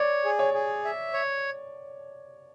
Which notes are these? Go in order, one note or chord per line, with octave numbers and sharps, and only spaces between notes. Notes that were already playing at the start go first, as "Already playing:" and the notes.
Already playing: C#5 D5
G#4
C#5
G#4
E5
C#5